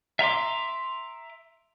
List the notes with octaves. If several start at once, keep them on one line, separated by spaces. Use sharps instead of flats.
E5 A#5 C6 D6